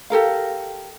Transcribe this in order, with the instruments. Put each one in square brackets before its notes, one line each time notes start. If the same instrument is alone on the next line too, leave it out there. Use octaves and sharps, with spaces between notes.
[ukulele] G4 A4 A#4 F5